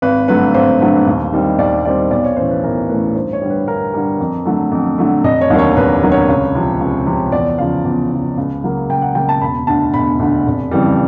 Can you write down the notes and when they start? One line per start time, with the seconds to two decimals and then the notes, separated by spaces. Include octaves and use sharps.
0.02 G#1 B4
0.28 G2 D3 F#3 A3 B4
0.54 G#1 C5
0.81 G2 D3 F#3 A3
1.07 D#2
1.33 D#3 G3 C4
1.58 D#2 D5
1.85 D#3 G3 C4 D5
2.11 B1 D5
2.24 C#5
2.37 A2 E3 A3 C#4 C5
2.51 B4
2.63 B1 A#4
2.89 A2 E3 A3 C#4 B4
3.15 G2 C5
3.33 C#5
3.42 D3 G3
3.50 B4
3.67 G2 A#4
3.94 D3 G3 A#4
4.20 F2
4.45 D3 F#3 A3
4.71 F2
4.98 D3 F#3 A3
5.23 F1 D#5
5.41 C#5
5.50 D#2 D3 F#3 A#3
5.59 C#5
5.76 F1 B4
6.03 D#2 D3 F#3 A#3
6.12 C#5
6.28 C#2
6.55 C3 F3
6.80 C#2
7.06 C3 F3
7.32 E2 D5
7.58 C#3 F3 F5
7.85 E2
8.11 C#3 F3
8.38 C#2
8.63 C#3 F#3 A#3
8.89 C#2 G5
9.02 F#5
9.15 C#3 F#3 A#3 G5
9.29 A5
9.41 E1 B5
9.67 D2 D3 A5
9.94 E1 B5
10.19 D2 D3
10.46 F1
10.71 F2 C#3 E3 G3